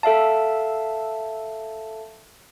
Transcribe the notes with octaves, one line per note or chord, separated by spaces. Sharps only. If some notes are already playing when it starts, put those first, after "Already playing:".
A4 E5 F5 A5